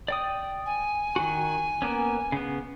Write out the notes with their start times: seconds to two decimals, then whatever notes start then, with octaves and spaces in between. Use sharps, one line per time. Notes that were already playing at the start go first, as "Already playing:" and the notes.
0.08 D5 G5 D#6
0.66 G#5
1.16 D#3 F#4
1.82 A#3 B3 C#4
2.32 C#3 B3